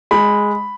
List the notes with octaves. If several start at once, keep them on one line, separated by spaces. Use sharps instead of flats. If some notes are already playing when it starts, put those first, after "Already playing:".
G#3 B5